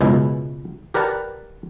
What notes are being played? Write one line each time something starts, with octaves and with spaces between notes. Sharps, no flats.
C#2 F#2 B2 G#3 B3 E4
G4 A#4 B4 D5 F#5 A5